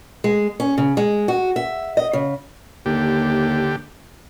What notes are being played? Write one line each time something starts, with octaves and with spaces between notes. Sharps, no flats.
G#3
C#4
C#3
G#3
F#4
E5
D#5
C#3
D#2 D3 G4